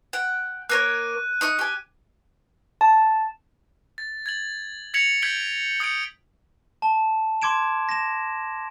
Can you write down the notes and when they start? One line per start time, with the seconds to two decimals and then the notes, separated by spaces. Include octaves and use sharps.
0.13 F#5 G5
0.69 A#3 A#4 C#5 F#6 D#7
1.41 D#4 C#6 D#6
1.59 G4 G#5
2.81 A5
3.98 A6
4.26 G#6 A6 F#7
4.94 G#6 A#6 B6 C#7 F7 F#7
5.22 G6 G#6 B6 D7 F#7 G7
5.80 D#6 G6 C#7 D7
6.82 A5
7.42 C6 D6 G#6 D7 E7
7.89 A#6 E7